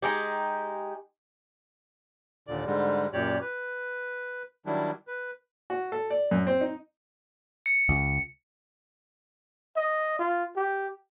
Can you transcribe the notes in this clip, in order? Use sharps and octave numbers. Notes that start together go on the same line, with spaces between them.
G#3 D#4 G4
D#2 A#2 D3 D5
G#2 D3 G3 G#3
F#2 A#2 G4 C#5 D5
B4
D#3 F#3 G3 D4 E4
B4
F#4
A4
D5
F#2
C4
D#4
C#7
C#2
D#5
F4
G4